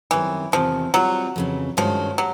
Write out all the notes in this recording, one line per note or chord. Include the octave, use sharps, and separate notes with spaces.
F#2 D#3 E3 G3 C4
E2 C3 D#3 F3
F#3 G3 C4 F4
F2 C#3 E3
G2 D#3 F3 G#3 C#4 F#4
F#3 G4